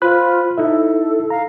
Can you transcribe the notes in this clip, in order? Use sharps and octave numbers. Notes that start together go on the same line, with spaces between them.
F4 C5 B5 F#6
D#4 E4 A4 E5
F5 A#5